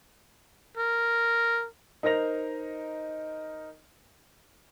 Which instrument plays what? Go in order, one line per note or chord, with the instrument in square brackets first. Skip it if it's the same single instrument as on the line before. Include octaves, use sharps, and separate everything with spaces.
[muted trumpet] A#4
[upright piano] D#4 A#4 C5 A#6 F7